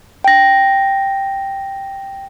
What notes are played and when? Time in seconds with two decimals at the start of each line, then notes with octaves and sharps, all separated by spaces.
0.24 G5 A#6